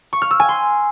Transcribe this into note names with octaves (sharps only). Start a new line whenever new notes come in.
C#6
F6
E6
G#5
C6